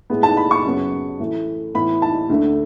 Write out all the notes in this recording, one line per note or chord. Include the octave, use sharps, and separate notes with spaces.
A2 G#3 B3
A5
B5
C#6
F#2 C#3 F#3 B3
A2 E3 A3
A2 E3 B3 B5
A5
D2 D3 A3